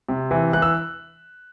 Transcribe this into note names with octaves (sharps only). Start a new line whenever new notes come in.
C3
E3
E3 F#6
E6